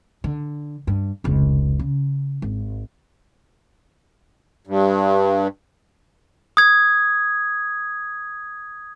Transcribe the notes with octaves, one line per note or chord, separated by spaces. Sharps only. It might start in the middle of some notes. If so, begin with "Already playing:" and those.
D3
G2
F1 C#2
C#3
G#1
G2
D#6 G#6